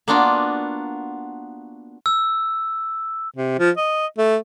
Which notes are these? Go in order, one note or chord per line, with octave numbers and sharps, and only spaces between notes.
A#3 B3 D4 F4 F#4
E6
C3
F3
D#5
A3